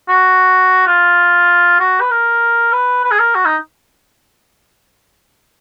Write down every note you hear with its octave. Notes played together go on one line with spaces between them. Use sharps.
F#4
F4
F#4
B4
A#4
B4
B4
G#4
A#4
F#4
D#4